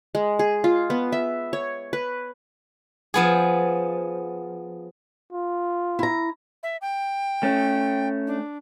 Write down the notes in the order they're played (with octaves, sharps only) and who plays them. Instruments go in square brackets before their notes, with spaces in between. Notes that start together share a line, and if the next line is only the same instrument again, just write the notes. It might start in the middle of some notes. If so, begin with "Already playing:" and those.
[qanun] G#3
G#4
F4
B3
E5
C#5
B4
[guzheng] F3 B3 G#4
[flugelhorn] F4
[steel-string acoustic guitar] E4 A#5
[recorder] E5
G5
[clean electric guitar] A3 C#4
[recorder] D4